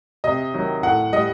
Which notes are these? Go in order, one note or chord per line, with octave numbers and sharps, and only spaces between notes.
C3 D#5
D#3 F#3
A2 F#5
G3 D#5